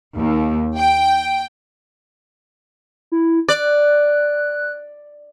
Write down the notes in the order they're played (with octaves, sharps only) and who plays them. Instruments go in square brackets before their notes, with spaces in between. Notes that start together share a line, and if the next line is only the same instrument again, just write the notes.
[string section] D#2
G5
[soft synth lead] E4
[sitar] D5 [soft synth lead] F#6